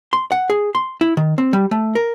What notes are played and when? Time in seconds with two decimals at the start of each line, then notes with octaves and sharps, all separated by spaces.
0.13 C6
0.32 F#5
0.50 G#4
0.75 C6
1.01 E4
1.17 D#3
1.38 C4
1.53 G3
1.71 A3
1.95 A#4